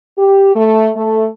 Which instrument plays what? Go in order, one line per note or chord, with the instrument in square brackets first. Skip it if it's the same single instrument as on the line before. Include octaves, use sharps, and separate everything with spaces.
[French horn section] G4
A3
A3